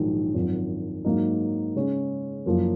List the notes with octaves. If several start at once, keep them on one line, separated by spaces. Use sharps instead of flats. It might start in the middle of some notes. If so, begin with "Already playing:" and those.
Already playing: A#1 G#2 D#3 F#3
G#1 F#2 F3
G#2 F#3 A#3 D#4
C#3 G#3 C#4
F#1 F#2 F3 A#3